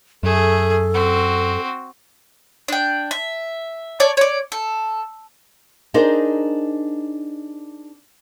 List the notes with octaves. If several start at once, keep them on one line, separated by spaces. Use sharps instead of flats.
F#2 A3 G#4 A4
C4 F#4
D4 G5
E5
C#5 D5 A5 C#6
C#5 D5
A4
D4 D#4 G#4 A#4 C5